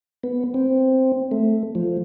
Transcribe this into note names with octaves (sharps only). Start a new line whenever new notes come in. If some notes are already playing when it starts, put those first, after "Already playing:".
B3
C4
A3
F3